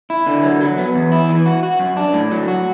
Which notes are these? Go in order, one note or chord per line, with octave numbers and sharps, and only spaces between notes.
E4
D3
F#3
F#3
B3
E2
E4
E3
F#4
F#4
F#2
D4
A2
F#3
F#4